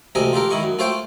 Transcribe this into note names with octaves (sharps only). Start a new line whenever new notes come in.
D2 C3 A4 A#4 D#5 G#5
F4 G4 A4 A#4
D#3 E4 D#5 C#6
F#2
A3 F4 A4 C5 C#5 G5